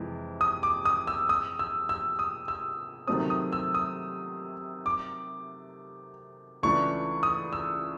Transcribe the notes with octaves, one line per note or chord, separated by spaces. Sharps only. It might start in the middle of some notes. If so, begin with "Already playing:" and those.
Already playing: F2 C3 E3 G#3
D#6
D6
D#6
E6
D#6
E6
E6
D#6
E6
C3 D#3 F#3 A3 C4 D#6
D#6
E6
D#6
D6
C#2 C#3 E3 A3 D4 C#6
D#6
E6